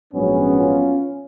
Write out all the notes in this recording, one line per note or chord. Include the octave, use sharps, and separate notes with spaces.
A#1 G#2 F#3 B3 C#4
C#4 F4